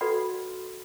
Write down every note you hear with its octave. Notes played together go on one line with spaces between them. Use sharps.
F#4 A4 B4 D5 F#5 B5